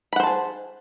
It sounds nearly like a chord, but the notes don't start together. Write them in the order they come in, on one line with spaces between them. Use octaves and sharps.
B5 F#5 C5 A5 G#4